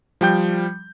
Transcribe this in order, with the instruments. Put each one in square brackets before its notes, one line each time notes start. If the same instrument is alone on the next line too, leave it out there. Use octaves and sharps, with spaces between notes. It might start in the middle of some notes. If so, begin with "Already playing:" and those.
[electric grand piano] F3 G3 G5 G6